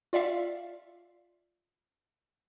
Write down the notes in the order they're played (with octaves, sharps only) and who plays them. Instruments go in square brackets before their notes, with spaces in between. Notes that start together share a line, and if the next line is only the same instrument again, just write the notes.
[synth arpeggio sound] F4 D5 E5 F5